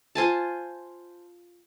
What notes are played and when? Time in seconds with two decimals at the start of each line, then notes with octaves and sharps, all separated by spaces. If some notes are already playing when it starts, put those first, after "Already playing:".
0.15 F4 C5 G#5 A5